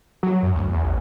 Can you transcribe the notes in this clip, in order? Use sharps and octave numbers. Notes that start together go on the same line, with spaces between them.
F#3
F#2
D2
E2
A1